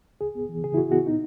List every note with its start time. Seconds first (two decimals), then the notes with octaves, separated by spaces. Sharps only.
0.21 C#2 G#4
0.35 B3
0.49 E3
0.64 C#3 G#4
0.74 E4
0.77 C#2 F#4
0.92 B3 F#4
1.06 A#2 D#4